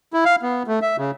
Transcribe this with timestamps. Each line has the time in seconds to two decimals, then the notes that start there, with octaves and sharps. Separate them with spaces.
0.13 E4
0.25 F5
0.42 B3
0.68 A3
0.82 E5
0.98 C#3